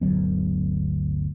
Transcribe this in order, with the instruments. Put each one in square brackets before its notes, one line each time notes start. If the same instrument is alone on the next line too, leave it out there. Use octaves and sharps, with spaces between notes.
[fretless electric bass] G1 D2 F#3 B3